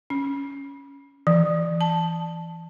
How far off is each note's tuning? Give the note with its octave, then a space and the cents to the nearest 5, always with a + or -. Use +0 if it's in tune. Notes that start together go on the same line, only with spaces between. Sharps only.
C#4 +10
E3 +20
A5 -5